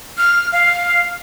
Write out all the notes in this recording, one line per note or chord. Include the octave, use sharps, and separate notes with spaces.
F6
F5